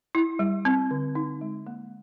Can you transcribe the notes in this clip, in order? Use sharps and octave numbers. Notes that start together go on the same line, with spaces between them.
E4
G3
C4
D3
D#4
G#3
A#3